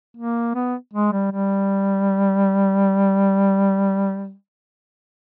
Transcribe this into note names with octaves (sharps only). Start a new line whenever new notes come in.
A#3
B3
G#3
G3
G3